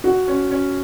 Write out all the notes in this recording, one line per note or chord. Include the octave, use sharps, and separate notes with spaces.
F#4
C#4
C#4